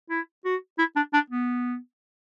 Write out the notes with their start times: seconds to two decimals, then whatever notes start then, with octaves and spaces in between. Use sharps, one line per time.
0.10 E4
0.45 F#4
0.78 E4
0.96 D4
1.13 D4
1.30 B3